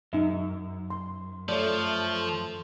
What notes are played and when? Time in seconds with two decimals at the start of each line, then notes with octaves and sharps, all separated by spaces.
0.13 F#2 D#4 E5
0.90 C6
1.49 F3 A3 C#5 D5